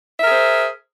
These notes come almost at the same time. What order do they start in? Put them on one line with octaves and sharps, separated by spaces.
E5 A#4 G#4 C5